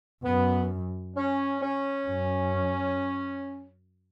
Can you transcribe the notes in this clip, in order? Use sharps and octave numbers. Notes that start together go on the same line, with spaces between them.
F#2 B3
C#4
C#4
F#2